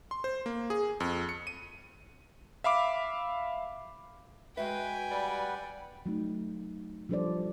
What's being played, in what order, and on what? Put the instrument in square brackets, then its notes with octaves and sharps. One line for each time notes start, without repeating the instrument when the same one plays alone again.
[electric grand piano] C6
C5
A#3
G#4
F2
C#7
D#7
E5 F5 B5 D6
[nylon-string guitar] G#3 F#4 E5 [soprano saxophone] B4 [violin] G5 G#5
[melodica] G3 B4 F#5 [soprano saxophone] D5
[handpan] F#3 A3 D#4
F3 G3 D4 A4 C5 D5